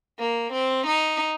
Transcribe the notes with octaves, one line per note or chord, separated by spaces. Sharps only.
A#3
C4
D#4